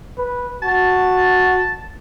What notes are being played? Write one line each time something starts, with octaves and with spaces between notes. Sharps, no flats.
B4
F#4 A5